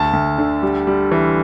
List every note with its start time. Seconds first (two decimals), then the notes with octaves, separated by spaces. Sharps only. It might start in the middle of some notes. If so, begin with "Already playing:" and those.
Already playing: D2 A5
0.13 D2
0.38 D3
0.63 G3
0.87 G3
1.12 E3